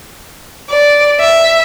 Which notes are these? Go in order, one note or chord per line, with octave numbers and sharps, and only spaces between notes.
D5
E5